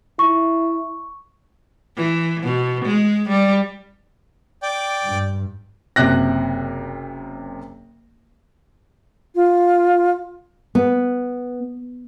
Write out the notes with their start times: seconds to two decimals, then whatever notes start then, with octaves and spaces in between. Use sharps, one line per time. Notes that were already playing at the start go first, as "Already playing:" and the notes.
0.19 E4 C#6
1.97 E3
2.43 B2
2.85 G#3
3.29 G3
4.63 D5 G5
5.04 G2
5.96 F#1 C3 F#6 A#6
9.35 F4
10.75 B3